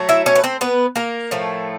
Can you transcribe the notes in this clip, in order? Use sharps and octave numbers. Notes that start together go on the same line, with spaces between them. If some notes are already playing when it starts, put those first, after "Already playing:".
Already playing: F#3 A3
E4 E5
C#4 C#5
B4
C4 C5
B3 B4
A#3 A#4
A2 F3 A3